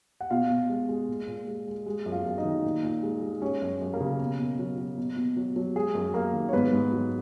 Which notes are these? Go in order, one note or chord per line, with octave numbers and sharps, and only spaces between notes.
F#5
B2 F4 F5
B2
G#3
G#3
A#2
A#2
G#3
G#3
G#3
F#2
F4 F5
F#2
D#4 D#5
D#3
A#2
A#2
G#3
G#3
G#3 C#4 C#5
F#2
F#2
A#3 A#4
C#3
B2
B2
F#3
F#3
B2
B2
F#3
F#3
F#3 G#3 G#4
F#2
F#2 A#3 A#4
D#3
C#5
G#2 B3 B4
G#2
F#3